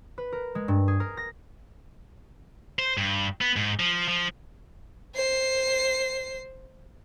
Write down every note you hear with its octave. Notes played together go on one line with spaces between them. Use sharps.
B4
A#4
G#3
G2
G#4
A#4
A#6
C5
G2
B3
G#2
F3
F3
C5 C7